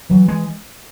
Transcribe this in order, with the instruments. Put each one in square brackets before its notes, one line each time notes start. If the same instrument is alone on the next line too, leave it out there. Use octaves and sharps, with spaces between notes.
[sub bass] E3 [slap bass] F#3
[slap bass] G#3